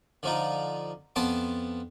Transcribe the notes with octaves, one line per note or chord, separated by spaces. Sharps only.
D3 F3 D#4
F2 B3 A5 C6 D6